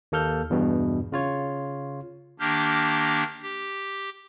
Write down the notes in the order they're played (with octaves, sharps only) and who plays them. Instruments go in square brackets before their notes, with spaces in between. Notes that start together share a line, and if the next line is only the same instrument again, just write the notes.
[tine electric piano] D#2 A#3 A4 F6 G6
E2 G2 B2
C#3 F4 C#5
[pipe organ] D#3 A#3 D4 G4 F6 G6
G4